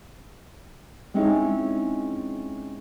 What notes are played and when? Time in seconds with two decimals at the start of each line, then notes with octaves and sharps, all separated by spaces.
1.14 G#3 C4 C#4 D#4 E4 G#4